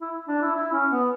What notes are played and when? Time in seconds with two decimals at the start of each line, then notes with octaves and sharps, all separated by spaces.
0.01 E4
0.28 D4
0.42 E4
0.55 E4
0.73 C#4
0.91 B3